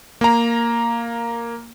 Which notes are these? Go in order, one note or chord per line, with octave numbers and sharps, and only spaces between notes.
A#3 A#5